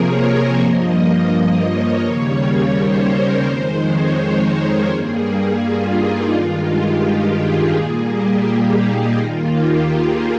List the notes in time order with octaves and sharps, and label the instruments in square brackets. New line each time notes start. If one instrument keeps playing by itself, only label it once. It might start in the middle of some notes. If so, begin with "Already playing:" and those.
Already playing: [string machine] C3 F3 A#3 G#4 A#4 C#5
C5
G2 F3 A#3 D#5
C#5
D#2 C#3 G3 A#3 C#5
C5
A#4
F2 D#3 G#3 C5
C#5
A#4
G2 G3 A#3 G#4
F4
D#4
G2 D#3 G#3 F4
G4
G4
G#4
A#2 G3 A#3
G4
D#4
D#2 D#3 A#3 F4
G4
G#4